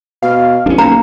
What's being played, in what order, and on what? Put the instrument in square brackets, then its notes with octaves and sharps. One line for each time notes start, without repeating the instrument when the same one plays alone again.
[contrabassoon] B2 [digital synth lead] F5
[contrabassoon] A1 [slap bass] C#4 D4
[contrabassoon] B1 [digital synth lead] A#3 [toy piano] A#5